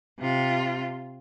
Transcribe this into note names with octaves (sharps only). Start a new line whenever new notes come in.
C3 F4